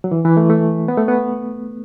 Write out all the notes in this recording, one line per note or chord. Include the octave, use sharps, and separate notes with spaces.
F#3
E3
E3
A3
A3
B3
A3
B3